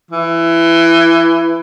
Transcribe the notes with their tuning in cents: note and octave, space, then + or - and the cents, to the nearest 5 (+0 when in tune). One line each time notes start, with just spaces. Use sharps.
E3 +15